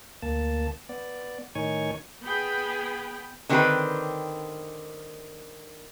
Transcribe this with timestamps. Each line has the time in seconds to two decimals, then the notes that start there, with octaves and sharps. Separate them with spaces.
0.22 D2 A#3 A5
0.89 B3 D5
1.55 A2 D#3 D#4 C#5 G#5 C#6
2.23 B3 G#4 G5 B5
3.49 D3 D#3 C4 D#4 G4 B4